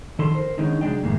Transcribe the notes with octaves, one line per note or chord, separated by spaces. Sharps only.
D#3 A4 C6
A#4 C5
D3 D#3 G#3 B3 C#4 D#4
C2 F#3 G#3 D4 G5
F#2 A2 D#3 G#3 A#3